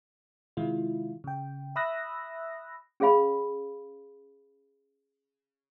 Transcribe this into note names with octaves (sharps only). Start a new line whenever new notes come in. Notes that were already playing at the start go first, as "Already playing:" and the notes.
C3 D#3 G#3 E4 F4
C#3 G5
E5 B5 D#6 E6 F#6 A#6
C#4 G#4 C#5 F5 B5